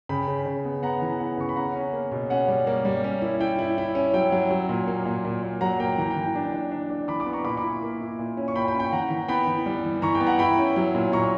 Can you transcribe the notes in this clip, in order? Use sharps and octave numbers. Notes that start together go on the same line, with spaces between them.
C#3 G5 B5
C#3
C#3
B3
B3 F#5 A#5
E3
B3
C#3 C#6
B5
C#4 F#5 A#5
C#4
A#3
B2
C#4 F#5
G3
A#3
G3
C#4
E4
E4 G5
E4
E4
C#4
F#3 G5
F#3
F#3
A#2
A#3
A#2
A#2
A#2
F#3 F#5 A#5
A#3 G5
E3 A#5
G5
E3
G5
D4
D4
D4
D4
E3 B5 D6
B5 D6
B3
A#5 C#6
A#2 B5 D6
B5 D6
E4
A#3
E4
A#2
C#4
C#6
A#2 G5 B5
G5 B5
C#4
G5
E3 F#5 A#5
E3
B3 G5 B5
E3
G3
E3
E3 A#5 C#6
G5
B3
F#5 A#5
E4 G5 B5
C#4
F#3
A#2
A#2 A#5 C#6